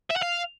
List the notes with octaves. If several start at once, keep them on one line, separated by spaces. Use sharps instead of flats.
E5
F#5
F5